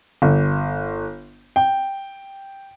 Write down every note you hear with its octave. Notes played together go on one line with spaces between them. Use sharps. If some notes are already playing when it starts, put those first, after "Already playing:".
G1
G5